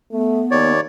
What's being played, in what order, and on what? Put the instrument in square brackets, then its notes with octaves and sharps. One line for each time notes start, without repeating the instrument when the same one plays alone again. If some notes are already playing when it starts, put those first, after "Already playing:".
[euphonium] A3 [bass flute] B3
[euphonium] D#2 [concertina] C#5 D5